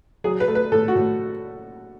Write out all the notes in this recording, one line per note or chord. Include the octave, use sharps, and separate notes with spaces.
F#3 G#4
B4
A3
B4
A2 A4
F#4
A2